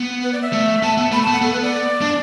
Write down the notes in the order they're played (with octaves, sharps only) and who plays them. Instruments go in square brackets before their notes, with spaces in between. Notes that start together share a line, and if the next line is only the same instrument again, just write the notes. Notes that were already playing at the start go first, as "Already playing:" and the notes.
Already playing: [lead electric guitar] B3
[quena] B4
D5
E5
[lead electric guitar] A3
[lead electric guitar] B3 [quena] A5
[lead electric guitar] B3
[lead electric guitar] A3 [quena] B5
[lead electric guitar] B3 [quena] A5
[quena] F#5
[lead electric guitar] B3 [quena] A4
[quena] B4
D5
[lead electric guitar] D4